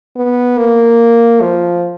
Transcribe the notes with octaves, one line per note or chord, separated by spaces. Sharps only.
B3
A#3
F3